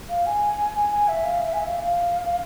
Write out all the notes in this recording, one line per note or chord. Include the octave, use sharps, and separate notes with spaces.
F5
G#5
G#5
E5
F5
E5
G#5
E5
F5
F5